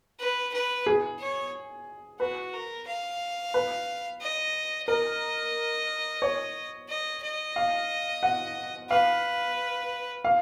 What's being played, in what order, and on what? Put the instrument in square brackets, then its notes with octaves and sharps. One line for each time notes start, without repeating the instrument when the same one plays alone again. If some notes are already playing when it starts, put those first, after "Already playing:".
[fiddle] B4
B4
[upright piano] G#4
[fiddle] C#5
[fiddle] F#4 [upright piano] B4
[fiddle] A#4
F5
[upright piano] B4
[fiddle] D#5
[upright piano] A#4 [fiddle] D#5
[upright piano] C#5
[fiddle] D#5
D#5
[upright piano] F5
F#5
[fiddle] B4 [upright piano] F5
[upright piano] F5